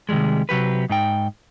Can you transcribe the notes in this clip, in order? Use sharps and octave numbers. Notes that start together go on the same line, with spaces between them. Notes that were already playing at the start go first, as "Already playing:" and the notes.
C3 D#3 E3 G3 G#3
C3 F#3 G4 B4
G#2 D#4 G5